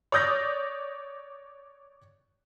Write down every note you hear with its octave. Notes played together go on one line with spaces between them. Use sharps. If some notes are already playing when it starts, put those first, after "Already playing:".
C#5 D5 D#6 G6 A#6